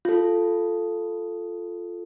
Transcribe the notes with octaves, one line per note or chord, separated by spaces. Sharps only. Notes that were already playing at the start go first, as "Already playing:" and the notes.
F4 A4